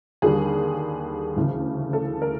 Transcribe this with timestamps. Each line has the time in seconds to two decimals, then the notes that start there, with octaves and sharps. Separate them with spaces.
0.22 D#2 D3 G3 G#4
1.36 D2 C#3 E3
1.93 A4
2.22 A#4